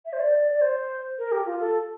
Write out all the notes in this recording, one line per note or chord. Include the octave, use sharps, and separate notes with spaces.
E5
C5
D5
D5
C5
A#4
G4
F4
A4